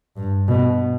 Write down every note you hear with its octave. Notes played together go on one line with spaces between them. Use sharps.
G2
B2